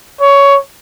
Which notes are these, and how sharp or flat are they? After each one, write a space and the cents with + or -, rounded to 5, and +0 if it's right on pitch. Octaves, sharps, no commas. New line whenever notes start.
C#5 +15